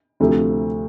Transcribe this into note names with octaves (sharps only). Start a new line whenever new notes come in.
D2 C3 F3 A3